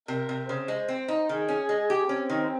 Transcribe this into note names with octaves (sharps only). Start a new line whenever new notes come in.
C3 A#4
C3
C#3 C5
G#3
C4
D#4
D#3 G#4
C#4
G#3
G4
C4 C#4
D#3